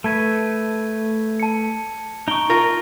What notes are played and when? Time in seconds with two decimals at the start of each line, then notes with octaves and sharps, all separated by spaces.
0.04 A3 B4 A5 G#6 D#7
1.40 A5 C#7
2.28 D#4 A#5 C#6 D7 G7
2.50 F4 A#4